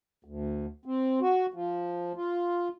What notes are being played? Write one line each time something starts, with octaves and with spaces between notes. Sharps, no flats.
D2
C4
F#4
F3
F4